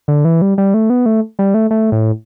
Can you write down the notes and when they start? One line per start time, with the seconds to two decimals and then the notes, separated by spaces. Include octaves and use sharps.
0.08 D3
0.25 E3
0.42 G3
0.58 G3
0.74 A3
0.90 B3
1.06 A3
1.39 G3
1.54 A3
1.71 A3
1.92 A2